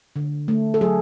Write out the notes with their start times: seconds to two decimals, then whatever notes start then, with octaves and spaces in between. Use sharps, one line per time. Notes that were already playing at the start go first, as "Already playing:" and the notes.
0.16 D3
0.48 A3
0.74 A4
0.81 F#3 G#4